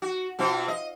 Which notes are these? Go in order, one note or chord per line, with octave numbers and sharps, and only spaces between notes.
F#4
B2 C4 F4
D#5